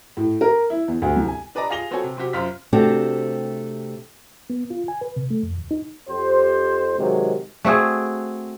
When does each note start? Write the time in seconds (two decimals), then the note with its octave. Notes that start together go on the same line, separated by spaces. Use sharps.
0.17 A2
0.41 A#4
0.70 E4
0.88 E2
1.02 D2
1.16 C2
1.28 G#5
1.55 D4 B4 D5 D#5 A#5
1.70 F4 G#4 A#6 F7 G7
1.91 B3 C4 F#4 A4 C#5 G#5
2.04 C3
2.17 C3 C4 F#4 G4
2.33 F#2 F4 C5 F6 B6
2.73 C3 A3 C4 D4 F#4 G4
4.50 B3
4.70 F4
4.88 G#5
5.01 B4
5.16 C3
5.31 A3
5.43 F2
5.58 D#2
5.71 D#4
6.09 F2 G4 C5
6.98 C3 D#3 F#3 G#3
7.65 A3 C4 F#4 G#4